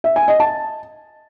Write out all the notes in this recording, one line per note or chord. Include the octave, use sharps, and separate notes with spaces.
E5
G#5
D#5
A5